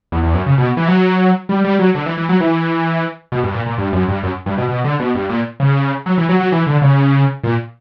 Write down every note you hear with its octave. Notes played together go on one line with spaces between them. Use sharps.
E2
E2
F#2
C#3
B2
E3
F#3
G3
G3
F#3
D3
E3
E3
F#3
E3
B2
G2
A#2
A#2
G2
F#2
G2
F#2
G2
B2
B2
D3
B2
G2
A#2
C#3
F#3
E3
F#3
F#3
E3
D3
C#3
A#2